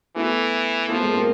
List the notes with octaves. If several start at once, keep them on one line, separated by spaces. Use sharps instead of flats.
E3 A3 B3
F3 A3 B3
G#3 A#3
A#3 C4